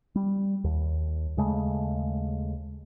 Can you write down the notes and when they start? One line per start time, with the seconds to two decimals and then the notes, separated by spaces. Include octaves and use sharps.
0.15 G3
0.64 D#2
1.37 D#2 C#3 G#3 A3